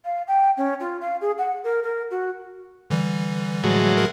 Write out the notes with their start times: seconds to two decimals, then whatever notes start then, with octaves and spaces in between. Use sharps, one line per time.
0.05 F5
0.27 G5
0.57 C#4
0.80 F4
1.01 F5
1.21 G#4
1.38 F#5
1.64 A#4
1.83 A#4
2.11 F#4
2.90 D3 E3 G3
3.64 A2 F#3 G#3
3.97 A#4